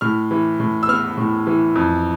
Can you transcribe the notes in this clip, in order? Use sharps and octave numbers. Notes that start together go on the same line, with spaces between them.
A2 F6
E3
A2
E6
B3 F6
A2
E3
F2